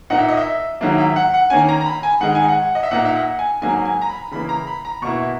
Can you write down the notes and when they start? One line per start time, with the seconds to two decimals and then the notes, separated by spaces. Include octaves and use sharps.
0.10 A#2 A#3 D#4 F#5
0.19 E5
0.29 D#5
0.37 E5
0.81 G#2 D#3 F#3 A#3 E4
0.98 E5
1.16 F#5
1.34 F#5
1.50 D#3 A#3 C#4 G#5
1.69 A#5
1.81 A#5
1.86 B5
2.03 G#5
2.21 G#2 D#3 G#3 D#4 F#5
2.35 G#5
2.48 F#5
2.75 D#5
2.83 E5
2.91 A#2 A#3 D#4 F#5
3.05 E5
3.15 F#5
3.39 G#5
3.62 G#2 F#3 A#3 G#5
3.85 G#5
4.02 A#5
4.09 B5
4.31 C#3 E3 A#3 B5
4.49 A#5
4.67 B5
4.85 A#5
5.02 B2 A#3 E4 C#6